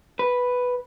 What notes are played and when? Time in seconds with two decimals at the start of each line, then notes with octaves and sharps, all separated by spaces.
0.19 B4